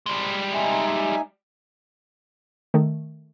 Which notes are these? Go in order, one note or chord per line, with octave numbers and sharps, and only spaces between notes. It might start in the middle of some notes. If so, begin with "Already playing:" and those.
G3 G#3
D#4 E5 G#5
D#3 A3